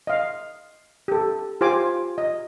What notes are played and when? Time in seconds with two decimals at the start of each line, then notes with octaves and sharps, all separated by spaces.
0.07 D#5 F5
1.08 G4 A4
1.61 F4 G4 C5 G#5 D6
2.18 D#5